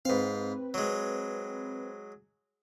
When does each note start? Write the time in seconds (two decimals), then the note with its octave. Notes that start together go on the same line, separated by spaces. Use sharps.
0.05 G#2 C4 B4 F5
0.74 F#3 G#3